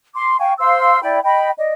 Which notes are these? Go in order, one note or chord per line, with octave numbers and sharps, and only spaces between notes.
C6 D6
F5 G5 G#5 C#6
C5 F5 C6 E6
E4 D5 G5 B5
D#5 G5 B5
D5 D#5